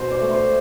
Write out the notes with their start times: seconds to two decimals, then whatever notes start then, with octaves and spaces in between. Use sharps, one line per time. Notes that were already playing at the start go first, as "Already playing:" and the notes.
Already playing: B2 C5
0.11 D5
0.21 A3
0.31 C5